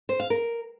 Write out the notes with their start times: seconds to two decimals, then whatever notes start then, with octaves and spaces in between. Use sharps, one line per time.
0.09 C5
0.20 F5
0.30 A#4